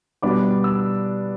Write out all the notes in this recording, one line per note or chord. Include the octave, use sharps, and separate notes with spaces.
B2 G3 B3 D4 D6
E6